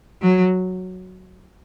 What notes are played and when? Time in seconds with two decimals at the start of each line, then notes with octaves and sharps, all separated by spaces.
0.22 F#3